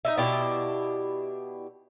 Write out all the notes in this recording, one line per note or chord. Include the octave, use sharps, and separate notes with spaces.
D#4 D#5 E5
B2 D4 E4 G4